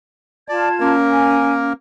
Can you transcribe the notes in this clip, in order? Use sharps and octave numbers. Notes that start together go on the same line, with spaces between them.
F4 D5 A5 G#6
A#3 C#4 A#4
G#5